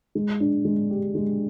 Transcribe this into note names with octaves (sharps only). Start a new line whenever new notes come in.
G#3
D4
G#3
G4
G#3